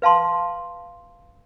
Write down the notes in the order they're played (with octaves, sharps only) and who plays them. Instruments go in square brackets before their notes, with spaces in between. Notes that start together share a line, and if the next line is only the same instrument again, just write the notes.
[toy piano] B4 F5 A5 C6